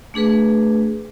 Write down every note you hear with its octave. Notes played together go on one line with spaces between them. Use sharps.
A3 D4 G#4 B4